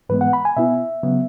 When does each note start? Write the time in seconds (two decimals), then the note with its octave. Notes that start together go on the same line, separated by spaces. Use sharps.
0.09 G#2 E3 G#3 B3 B4
0.21 F#5
0.33 B5
0.45 G#5
0.57 B2 B3 E4 E5
1.03 C#3 F#3 B3